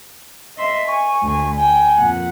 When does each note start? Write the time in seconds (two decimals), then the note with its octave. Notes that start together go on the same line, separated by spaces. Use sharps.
0.56 D#5 E5 C6
0.88 G#5 C#6
1.23 D2 G#5
1.57 G5 G#5
1.97 F2 A#2 F#5